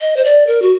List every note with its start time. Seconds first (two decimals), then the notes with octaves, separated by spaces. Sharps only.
0.01 D#5
0.16 C5
0.24 D5
0.47 A#4
0.62 F#4